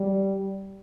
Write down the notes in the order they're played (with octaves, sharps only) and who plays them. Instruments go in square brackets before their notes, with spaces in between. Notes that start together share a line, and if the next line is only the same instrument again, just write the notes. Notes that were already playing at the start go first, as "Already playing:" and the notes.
Already playing: [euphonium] G3